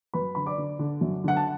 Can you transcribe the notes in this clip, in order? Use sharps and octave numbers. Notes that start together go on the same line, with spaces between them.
F#2 B4 B5
D3 B5
D5 D6
D3
D3
F#2
D3 F#5
A5